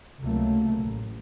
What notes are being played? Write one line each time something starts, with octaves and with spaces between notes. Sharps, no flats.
C#2 C3 F#3 A3 A#3
A1